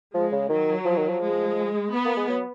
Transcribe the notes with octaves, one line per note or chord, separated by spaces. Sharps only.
F3 G#3
C#3
D#3 F#3
F3
D#3
F3
G#3
B3
A#3
G#3
F#3